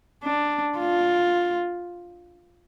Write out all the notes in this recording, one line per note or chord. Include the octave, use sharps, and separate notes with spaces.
D4
F4